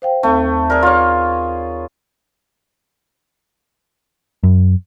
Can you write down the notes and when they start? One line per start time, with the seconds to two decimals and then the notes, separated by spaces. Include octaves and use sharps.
0.02 C5 F5 G5
0.23 D#2 A3 C4
0.70 G#4 A#4 D5
0.83 F4 C#5
4.43 F#2